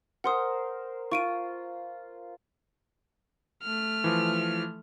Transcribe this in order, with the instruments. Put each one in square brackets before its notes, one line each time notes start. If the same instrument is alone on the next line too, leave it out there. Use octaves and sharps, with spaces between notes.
[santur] A#4 C5 [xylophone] F#5 C6 D#6
[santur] F4 [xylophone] C#6 D7 D#7
[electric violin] A3 F6
[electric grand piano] E3 F3